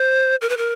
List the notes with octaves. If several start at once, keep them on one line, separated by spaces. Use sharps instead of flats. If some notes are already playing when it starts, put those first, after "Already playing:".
Already playing: C5
A#4
B4
A#4